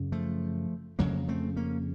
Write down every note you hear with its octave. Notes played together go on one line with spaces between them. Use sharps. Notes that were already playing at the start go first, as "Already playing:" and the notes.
Already playing: F#2 C#3
F3 A3
F2 C#3 F#3 A#3
A3 C4
A#3 C#4